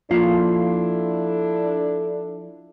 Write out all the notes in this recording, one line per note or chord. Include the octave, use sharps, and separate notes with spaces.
F3 A#3 D4 E4 F4 A4 F5